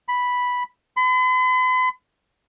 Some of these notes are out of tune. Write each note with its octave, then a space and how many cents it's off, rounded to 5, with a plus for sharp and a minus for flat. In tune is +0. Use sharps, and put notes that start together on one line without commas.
B5 -5
B5 +45